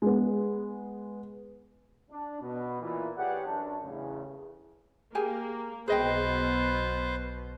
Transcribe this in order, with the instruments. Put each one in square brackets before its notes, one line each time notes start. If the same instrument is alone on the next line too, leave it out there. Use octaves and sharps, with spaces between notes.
[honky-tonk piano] G#3 B3
[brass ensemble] D4
B2
A#2 E3
G4 G#4 B4 C#5 D5 F#5
F#2 D4 A5
A1 E2 C#3
[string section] A#3 [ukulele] G4 G#4 G#5
[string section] B1 B2 [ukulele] G#4 D#5 G5 [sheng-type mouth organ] B4 C5